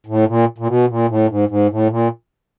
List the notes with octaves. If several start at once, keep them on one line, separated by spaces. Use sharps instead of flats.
A2
A#2
A#2
B2
A#2
A2
G#2
G#2
A2
A#2